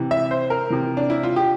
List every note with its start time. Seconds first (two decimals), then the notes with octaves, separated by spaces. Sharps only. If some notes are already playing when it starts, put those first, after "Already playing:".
Already playing: C3 E3
0.11 E5
0.31 C5
0.50 A#4
0.70 C3 E3
0.97 D4
1.10 E4
1.23 F4
1.36 G4